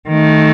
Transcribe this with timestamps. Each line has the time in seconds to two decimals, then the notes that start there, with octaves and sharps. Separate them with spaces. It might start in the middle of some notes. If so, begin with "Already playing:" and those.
0.09 D#3 A3